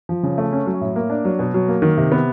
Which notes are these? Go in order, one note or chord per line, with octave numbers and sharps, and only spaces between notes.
F3
C#3
A3
C#4
F#3
A2
A#3
D4
F#3
B2
F#3
A#3
D#3
C3
B3